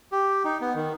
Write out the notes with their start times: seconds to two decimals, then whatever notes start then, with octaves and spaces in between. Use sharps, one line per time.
0.12 G4
0.45 D#4
0.61 B3
0.75 D#3